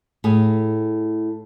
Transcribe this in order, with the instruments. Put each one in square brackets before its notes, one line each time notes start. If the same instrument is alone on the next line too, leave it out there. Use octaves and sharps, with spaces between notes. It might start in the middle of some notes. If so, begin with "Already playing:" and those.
[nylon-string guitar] A2 G#4